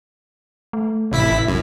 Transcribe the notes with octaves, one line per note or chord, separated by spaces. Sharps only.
A3
A1 C3 E4 B6
F#2